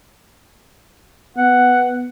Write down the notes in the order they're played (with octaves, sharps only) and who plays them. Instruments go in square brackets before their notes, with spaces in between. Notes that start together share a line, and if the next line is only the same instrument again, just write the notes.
[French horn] B3 [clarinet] F#5